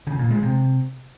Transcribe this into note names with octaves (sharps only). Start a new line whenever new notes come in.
C#3
A#2
G#3
C3